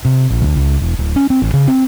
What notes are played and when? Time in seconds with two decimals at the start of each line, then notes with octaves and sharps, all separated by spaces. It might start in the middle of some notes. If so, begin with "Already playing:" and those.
0.05 C3
0.30 A#1
0.42 D2
0.56 C#2
0.82 E1
0.99 D1
1.16 C#4
1.30 C4
1.42 A1
1.54 C#3
1.68 C4